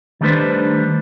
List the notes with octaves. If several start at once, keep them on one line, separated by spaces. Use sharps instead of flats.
D#3 G3 A3 D4 B4 C5